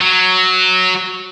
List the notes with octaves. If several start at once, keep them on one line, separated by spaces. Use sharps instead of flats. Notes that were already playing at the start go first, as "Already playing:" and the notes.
F#3